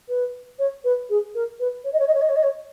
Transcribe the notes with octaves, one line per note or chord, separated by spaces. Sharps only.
B4
C#5
B4
G#4
A#4
B4
C#5
D#5
C#5
D#5
C#5
D#5
C#5
D#5
C#5